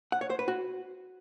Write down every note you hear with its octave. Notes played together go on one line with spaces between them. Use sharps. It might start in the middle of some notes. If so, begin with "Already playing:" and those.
F#5
C#5
C5
B4
F#4